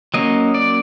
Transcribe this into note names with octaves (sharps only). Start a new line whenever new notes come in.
F#3 A#3 C#4 D#5
D5